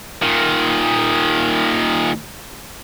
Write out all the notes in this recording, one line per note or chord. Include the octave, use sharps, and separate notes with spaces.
A#2 D#3